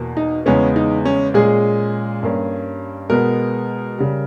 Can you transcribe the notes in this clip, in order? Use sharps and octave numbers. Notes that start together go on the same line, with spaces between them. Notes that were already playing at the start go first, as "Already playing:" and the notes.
Already playing: E2 B2 A#3
D#4
E2 C#3 G#3 B3 C#4
D#4
C#4
A#2 G#3 C#4 G#4
G2 G3 A#3 C#4
B2 G#3 B3 A#4
C#3 G3